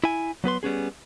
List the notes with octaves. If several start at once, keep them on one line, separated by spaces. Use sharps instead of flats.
E4 G#5
F#3 B3 B4 C6
G3 B3 C#4 G#4